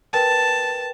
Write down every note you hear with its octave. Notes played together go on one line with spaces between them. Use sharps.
A#4 B4 G5 A5